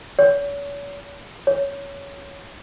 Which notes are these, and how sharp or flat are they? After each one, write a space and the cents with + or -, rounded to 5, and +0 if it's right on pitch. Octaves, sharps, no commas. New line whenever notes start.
C#5 +40
C#5 +10